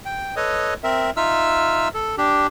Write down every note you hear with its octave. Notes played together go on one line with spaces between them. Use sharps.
G5
A4 B4 C#5 D#5 D#6
C4 A#4 E5
D#4 F4 E5 E6 F6
A4
D4 G4